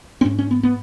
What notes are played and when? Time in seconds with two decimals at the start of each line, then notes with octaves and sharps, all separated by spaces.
0.21 C4
0.25 G#2 C#4
0.39 C#4
0.51 B3
0.63 B3